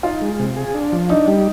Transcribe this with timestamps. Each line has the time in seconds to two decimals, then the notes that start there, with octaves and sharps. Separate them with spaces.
0.03 D#4 F4
0.22 G#3
0.40 C3
0.57 G#4
0.74 D4
0.92 F3
1.09 D4 D#4
1.28 G3